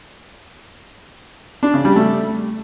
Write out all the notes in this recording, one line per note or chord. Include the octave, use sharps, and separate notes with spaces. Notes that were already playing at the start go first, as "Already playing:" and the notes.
D4
C#3
G3
A3